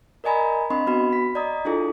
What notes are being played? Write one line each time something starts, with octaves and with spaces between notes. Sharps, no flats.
A#4 D5 D#5 G#5 A#5 B5
C4 D4 D#5 B5 C6
B3 F#4 B5
B6
D5 D#5 A#5 D#6
D4 E4 F4 G#4 A4